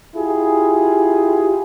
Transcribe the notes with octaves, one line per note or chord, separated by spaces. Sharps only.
E4 F4 G4 G#4